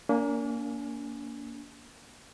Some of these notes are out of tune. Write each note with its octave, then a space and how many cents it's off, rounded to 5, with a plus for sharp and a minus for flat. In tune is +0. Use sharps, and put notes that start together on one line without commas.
A#3 +0 D4 -45 G#5 +5